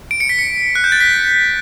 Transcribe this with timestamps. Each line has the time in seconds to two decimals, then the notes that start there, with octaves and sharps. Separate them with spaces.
0.11 D7
0.20 C#7
0.29 B6
0.39 C#7
0.75 F#6
0.84 G6
0.92 A6
1.00 B6